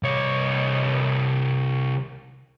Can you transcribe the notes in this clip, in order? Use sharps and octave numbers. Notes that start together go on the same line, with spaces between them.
C2 C#5